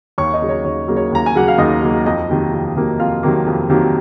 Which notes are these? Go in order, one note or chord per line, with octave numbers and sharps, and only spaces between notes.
D#2 C#5 C#6
D#4 D#5
C#3 F#3 A#3
C#5
D#2 C#5
C#3 F#3 A#3
C#5
D#2 A#5
G#5
C#3 F#3 A#3 F#5
F5
D#2 D#4 D#5
C#3 F#3 A#3
F2 D#4 D#5
C3 D#3 F#3 A#3
F2
C3 D#3 F#3 A#3
F2 F4 F5
C3 D#3 F#3 A#3
F2
C3 D#3 F#3 A#3